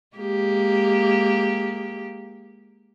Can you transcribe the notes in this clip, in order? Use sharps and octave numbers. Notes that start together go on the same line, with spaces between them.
G#3 A#3 G4